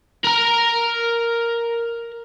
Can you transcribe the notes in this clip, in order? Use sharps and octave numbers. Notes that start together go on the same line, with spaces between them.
A#4 A#5